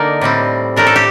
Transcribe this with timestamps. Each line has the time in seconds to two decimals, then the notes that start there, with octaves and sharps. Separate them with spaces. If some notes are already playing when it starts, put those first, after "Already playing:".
Already playing: D3 A#3 D#4 A#4 D5
0.21 A2 G3 C4
0.76 A2 A3 D4 A#4
0.87 A4
0.96 G4